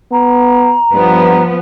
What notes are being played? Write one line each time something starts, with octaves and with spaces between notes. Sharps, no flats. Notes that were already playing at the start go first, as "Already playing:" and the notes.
B3 A#5
G2 F3 B3